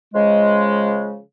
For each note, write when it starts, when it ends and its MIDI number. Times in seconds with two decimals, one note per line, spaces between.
0.14 1.20 49
0.14 1.20 53
0.14 1.20 56